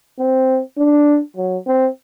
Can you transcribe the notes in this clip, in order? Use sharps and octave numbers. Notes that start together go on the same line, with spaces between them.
C4
D4
F#3
C4